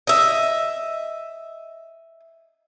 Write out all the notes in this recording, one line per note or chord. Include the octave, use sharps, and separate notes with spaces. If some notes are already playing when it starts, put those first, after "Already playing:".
D#5 E5